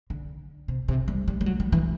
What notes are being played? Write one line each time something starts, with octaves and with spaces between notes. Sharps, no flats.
D3
C3
C3
G3
G3
G3
F#3
G3
E3